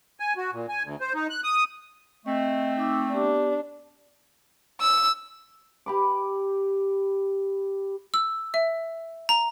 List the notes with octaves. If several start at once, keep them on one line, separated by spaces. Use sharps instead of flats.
G#5
F#4
A#2
G#5
D2
C5
D#4
F#6
D#6
A3 C4 D#5
D#4 D6 E6
B3 D4 G4 D6
E6
G4 B5 D6
E6
E5
A#5